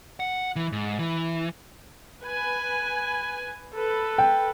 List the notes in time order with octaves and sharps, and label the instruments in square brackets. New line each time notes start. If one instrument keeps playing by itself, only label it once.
[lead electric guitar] F#5
E3
G#2
E3
[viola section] B4 G#5
A4 B4
[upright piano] G5